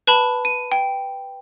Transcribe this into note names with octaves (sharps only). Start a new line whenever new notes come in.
B4 A5 B5
D#7
G5